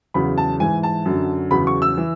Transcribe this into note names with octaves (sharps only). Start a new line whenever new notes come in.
E2 C#3 F#3 B5
A5
G#2 E3 G#5
A5
F#2 D3 F#3
E2 C#3 F#3 B5
C#6
E6
E3